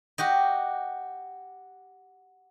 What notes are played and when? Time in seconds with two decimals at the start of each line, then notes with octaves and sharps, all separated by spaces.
0.18 F#4 G4 D#5